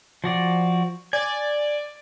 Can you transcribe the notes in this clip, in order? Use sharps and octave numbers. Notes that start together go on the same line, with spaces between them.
F3 F#4 D5
D5 G#5